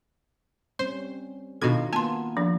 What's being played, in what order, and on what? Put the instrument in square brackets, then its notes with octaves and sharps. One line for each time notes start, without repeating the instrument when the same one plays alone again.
[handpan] G3 C4 C#4 [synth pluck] C5
[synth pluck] B2 G#6 [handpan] D#3 D#4 F4 [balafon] D4 F#4 A4
[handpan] A#3 B3 F4 [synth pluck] G#5 [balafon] A5 C6
[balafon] F3 D4